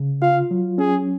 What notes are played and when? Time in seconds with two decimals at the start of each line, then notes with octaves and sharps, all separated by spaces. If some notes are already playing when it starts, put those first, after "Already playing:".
Already playing: C#3
0.22 F4 F5
0.51 F#3
0.78 C#4 G#4